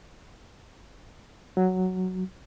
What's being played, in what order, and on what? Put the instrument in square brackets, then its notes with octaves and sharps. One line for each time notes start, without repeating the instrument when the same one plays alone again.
[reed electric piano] F#3